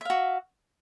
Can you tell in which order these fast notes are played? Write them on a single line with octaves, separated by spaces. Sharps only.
E5 F5 F#4